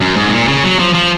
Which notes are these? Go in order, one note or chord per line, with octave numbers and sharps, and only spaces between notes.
F#2
G#2
C3
A#2
C#3
F#3
F3
F3